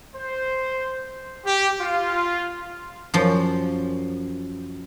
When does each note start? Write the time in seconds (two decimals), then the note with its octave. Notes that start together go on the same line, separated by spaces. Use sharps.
0.16 C5
1.46 G4
1.81 F4
3.14 F#2 F3